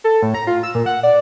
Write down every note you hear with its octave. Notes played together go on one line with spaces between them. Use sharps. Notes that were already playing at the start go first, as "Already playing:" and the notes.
A4
A2
A#5
F4
E6
A#2
F#5
D5